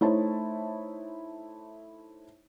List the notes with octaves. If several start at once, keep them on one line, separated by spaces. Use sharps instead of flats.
A3 D#4 E4 C5 C#5 A5